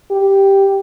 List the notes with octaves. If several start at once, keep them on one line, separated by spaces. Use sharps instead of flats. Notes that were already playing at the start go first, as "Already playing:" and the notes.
G4